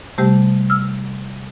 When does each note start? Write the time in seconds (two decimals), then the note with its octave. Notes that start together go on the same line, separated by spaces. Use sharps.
0.18 C3 G3 A3 G4
0.70 E6 F6